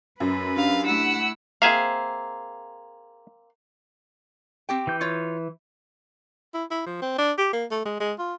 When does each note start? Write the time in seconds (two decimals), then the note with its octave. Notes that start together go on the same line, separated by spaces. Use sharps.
0.20 F#2 B4
0.57 D4 G4 F5
0.86 A3 E4 F#5 E6
1.62 A#3 C4 G#4 E5 F5
4.69 C4 G4 G5
4.87 E3 G6
5.01 F4 C#5
6.54 E4
6.71 E4
6.86 F3
7.02 C4
7.18 D4
7.38 G4
7.53 A#3
7.71 A3
7.85 G#3
8.00 G#3
8.19 F4